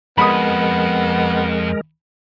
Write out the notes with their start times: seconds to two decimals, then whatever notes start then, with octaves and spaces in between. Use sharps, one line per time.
0.18 F2 G#3 B3 A#4 B5 D#6